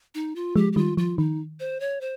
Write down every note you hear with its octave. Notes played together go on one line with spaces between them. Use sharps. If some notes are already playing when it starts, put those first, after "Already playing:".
D#4
F4
F3 G#3 G4
G4
D#3 G3 F4
F3 F4
D#3 D#4
C5
C#5
C5